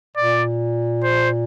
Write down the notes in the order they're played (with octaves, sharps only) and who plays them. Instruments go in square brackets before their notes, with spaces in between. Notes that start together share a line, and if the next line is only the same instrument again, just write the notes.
[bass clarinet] A#2 [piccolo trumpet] D5
[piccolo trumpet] C5